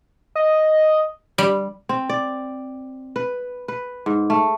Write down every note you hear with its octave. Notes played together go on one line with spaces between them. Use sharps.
D#5
G3
C4
D5
B4
B4
G#2
A3